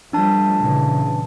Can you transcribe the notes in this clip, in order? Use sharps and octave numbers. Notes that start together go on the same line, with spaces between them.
F3 G3 A3 D4 A5
A#2 C#3 E3